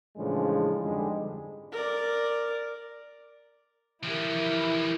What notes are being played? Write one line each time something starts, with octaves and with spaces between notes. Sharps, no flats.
A2 C#3 E3 F3 G#3 D4
F2 G#2 D3 G3 G#3
A#4 D5
E3 F3 E4 G4 A#4